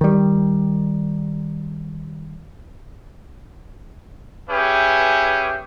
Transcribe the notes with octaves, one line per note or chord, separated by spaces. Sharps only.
D#3 G3
C#4 G4 G#4 B4 E5